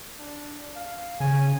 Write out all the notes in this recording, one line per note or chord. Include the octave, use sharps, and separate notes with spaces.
D4
F5
C#3 G#5